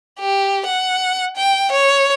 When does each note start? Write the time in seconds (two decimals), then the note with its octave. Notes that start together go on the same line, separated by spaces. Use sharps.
0.20 G4
0.66 F#5
1.36 G5
1.71 C#5